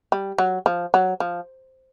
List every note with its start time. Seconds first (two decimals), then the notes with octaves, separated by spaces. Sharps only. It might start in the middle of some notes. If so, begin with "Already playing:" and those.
0.12 G3
0.38 F#3
0.66 F3
0.94 F#3
1.20 F3